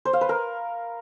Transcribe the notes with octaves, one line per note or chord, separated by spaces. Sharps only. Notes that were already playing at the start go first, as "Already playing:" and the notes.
C5
F5
B4
A#4